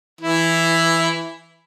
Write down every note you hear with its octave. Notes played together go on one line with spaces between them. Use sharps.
E3 E4